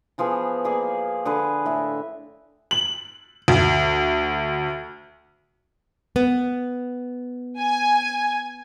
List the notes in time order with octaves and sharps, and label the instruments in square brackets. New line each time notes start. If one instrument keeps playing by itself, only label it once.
[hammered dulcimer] E3 F3 B3 G#4
A#3 G#4 D5
D3 G#4 B4
A2 E5
[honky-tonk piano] F#7
D2
[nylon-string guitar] B3
[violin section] G#5